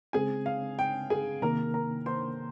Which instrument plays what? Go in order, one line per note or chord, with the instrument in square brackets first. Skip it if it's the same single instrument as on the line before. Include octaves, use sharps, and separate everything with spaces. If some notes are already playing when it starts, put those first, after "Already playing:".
[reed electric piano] C#3 G#3 C4 [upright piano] G#4 G#5
[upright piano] F5
G5
G#4 G#5
[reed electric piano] C3 D#3 A#3 [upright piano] A#4 A#5
[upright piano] A#4 A#5
C5 C6